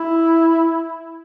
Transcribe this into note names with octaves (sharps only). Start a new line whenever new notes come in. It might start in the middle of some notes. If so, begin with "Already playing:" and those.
Already playing: E4